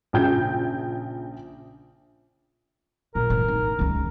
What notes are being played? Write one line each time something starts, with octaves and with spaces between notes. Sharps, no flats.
A#1 C#3 G5 G6
A#1 A#4
G#2 E3
D#4
C#2 D#3